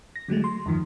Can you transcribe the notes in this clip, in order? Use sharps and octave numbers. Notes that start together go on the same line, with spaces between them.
A#6
D3 F#3 G#3 A3
C6
E2 G2 D#3 F3